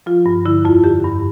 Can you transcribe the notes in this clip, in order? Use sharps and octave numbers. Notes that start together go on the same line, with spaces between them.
F3 F4
G2
D3 E4
F2 F4
D3 G4
G2